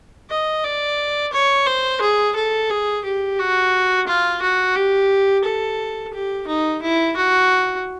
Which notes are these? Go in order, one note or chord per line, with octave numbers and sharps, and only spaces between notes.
D#5
D5
C#5
C5
G#4
A4
G#4
G4
F#4
F4
F#4
G4
A4
G4
D#4
E4
F#4